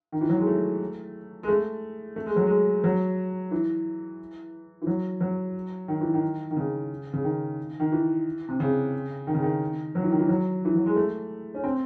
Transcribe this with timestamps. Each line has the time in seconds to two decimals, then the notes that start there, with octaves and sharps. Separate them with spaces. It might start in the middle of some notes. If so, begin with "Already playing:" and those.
0.12 D#3
0.21 E3
0.29 F#3
0.38 G#3
0.47 A3
1.43 G#3
1.48 A3
2.16 A3
2.26 G#3
2.36 F#3
2.47 G#3
2.84 F#3
3.51 E3
4.82 E3
4.87 F#3
5.21 F#3
5.88 D#3
6.01 E3
6.14 D#3
6.51 D#3
6.57 C#3
7.13 C#3
7.24 D#3
7.80 D#3
7.92 E3
8.49 C3
8.60 C#3
9.27 D#3
9.35 C#3
9.43 D#3
9.95 F#3
10.03 E3
10.12 D#3
10.19 E3
10.29 F#3
10.65 E3
10.75 F#3
10.86 G#3
10.96 A3
11.55 C#4
11.64 C4